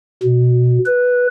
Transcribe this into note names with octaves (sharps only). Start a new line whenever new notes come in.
B2
B4